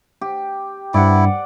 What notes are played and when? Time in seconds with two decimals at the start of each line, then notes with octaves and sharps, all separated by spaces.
0.21 G4
0.94 G2 E4 D5 F#5